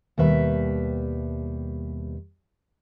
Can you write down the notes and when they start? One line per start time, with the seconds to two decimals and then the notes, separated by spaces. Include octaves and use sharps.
0.18 D#2 B2 G3 B4 E5